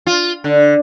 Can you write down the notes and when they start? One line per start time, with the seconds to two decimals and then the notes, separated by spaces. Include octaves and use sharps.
0.06 F4
0.44 D3